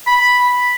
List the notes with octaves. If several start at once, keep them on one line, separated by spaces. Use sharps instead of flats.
B5